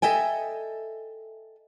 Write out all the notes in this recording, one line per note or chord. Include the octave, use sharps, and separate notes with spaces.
A4 D#5 E5 G5 G#5